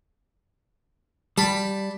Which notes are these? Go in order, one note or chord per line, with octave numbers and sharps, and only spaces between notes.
G3 A5 B5